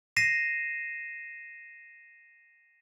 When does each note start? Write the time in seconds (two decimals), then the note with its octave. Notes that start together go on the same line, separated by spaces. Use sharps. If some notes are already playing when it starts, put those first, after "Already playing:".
0.16 A#6 C7 D#7 E7